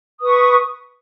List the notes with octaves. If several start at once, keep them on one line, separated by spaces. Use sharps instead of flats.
B4 C#6 D#6